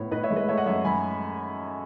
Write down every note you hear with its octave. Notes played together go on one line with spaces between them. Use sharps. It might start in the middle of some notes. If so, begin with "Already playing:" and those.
Already playing: A2 B3 C#5
A2 B4 D#5
C#5 E5
G#3
B4 D#5
A3 C#5 E5
D#5 F#5
F#2 C#5 E5
F#2 G#5 B5